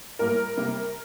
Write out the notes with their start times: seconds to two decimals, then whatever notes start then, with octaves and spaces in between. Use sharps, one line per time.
0.19 A2 G3 A#3 A#4
0.57 C3 G3 A#3